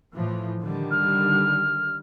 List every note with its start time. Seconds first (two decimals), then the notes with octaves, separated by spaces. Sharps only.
0.13 A2 E3 F3
0.60 D3 D#3 G3
0.91 F6